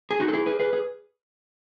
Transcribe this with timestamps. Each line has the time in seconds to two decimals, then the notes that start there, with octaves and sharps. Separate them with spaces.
0.11 G#4
0.20 D#4 F#4
0.28 A4
0.33 E4 G#4
0.46 G#4 B4
0.60 G#4 B4
0.73 G#4